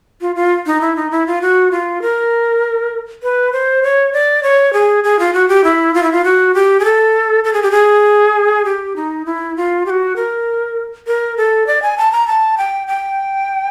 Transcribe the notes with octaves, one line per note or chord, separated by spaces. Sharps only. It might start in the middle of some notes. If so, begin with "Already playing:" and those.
F4
F4
D#4
E4
D#4
E4
F4
F#4
F4
A#4
B4
C5
C#5
D5
C#5
G#4
G#4
F4
F#4
G4
E4
F4
E4
F4
F#4
G4
G#4
A4
A4
G#4
G4
G#4
G4
D#4
E4
F4
G4
F#4
A#4
A#4
A4
D5
G#5
A5
A#5
A5
G5
G5